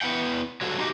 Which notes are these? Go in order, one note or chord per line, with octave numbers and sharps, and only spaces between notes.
B3 E4 F#5 G5
F#3 G3 F#4 A4
D#4 F#4 G4 D#5